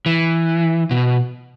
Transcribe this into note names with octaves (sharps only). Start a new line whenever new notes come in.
E3
B2